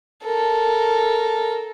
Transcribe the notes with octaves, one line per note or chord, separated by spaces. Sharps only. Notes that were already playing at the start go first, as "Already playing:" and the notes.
A4 A#4